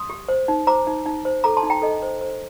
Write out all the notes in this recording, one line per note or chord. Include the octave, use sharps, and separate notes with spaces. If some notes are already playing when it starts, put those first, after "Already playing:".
Already playing: C6 D#6
G4
C5
D#4
C5 A#5 D6
D#4
D#4
C5
A4 A#5 D6
A5 C6
D#4
G5 A#5
A4 D#5
C5
C5